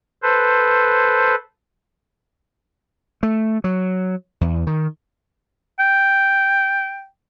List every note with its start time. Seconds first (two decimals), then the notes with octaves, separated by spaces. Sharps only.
0.22 A4 B4 C5
3.23 A3
3.64 F#3
4.41 E2
4.67 D#3
5.79 G5